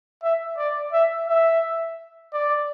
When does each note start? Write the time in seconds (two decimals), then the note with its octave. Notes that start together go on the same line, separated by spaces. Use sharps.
0.23 E5
0.57 D5
0.93 E5
1.28 E5
2.33 D5